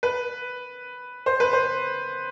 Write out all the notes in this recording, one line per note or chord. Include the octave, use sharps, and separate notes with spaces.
B4
C5
B4
C5